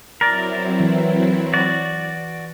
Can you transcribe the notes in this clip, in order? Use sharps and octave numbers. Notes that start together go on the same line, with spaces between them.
F#3 C4 E4 A#4 D5
E3
F#4 D5